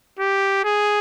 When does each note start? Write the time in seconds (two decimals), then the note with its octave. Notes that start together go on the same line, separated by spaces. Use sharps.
0.19 G4
0.64 G#4